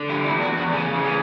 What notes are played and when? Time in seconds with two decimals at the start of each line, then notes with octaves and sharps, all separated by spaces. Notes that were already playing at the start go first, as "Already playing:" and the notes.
Already playing: D3
0.09 G3 E4
0.25 E4
0.30 E2
0.42 F#4
0.52 E2
0.57 F#4
0.72 C#3 C#4
0.93 E3
1.04 C#4